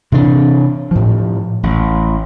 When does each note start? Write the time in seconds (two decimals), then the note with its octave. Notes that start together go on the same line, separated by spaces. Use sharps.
0.12 C3 E3 D4
0.91 A2 F3
1.63 A1